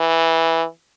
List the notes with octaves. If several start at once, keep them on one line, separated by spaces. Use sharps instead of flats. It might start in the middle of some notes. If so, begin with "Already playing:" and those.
Already playing: E3